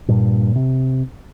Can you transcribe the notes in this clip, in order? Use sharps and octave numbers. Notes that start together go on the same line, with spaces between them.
G2 A#2
C3